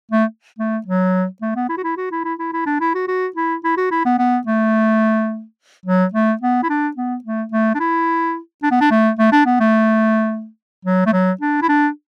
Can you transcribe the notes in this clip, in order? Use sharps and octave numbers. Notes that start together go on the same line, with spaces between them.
A3
A3
F#3
A3
B3
E4
F#4
E4
F#4
E4
E4
E4
E4
D4
E4
F#4
F#4
E4
E4
F#4
E4
B3
B3
A3
F#3
A3
B3
E4
D4
B3
A3
A3
D4
E4
D4
B3
D4
A3
A3
D4
B3
A3
F#3
A3
F#3
D4
E4
D4